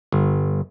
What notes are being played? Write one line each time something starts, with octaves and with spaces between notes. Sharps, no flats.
G1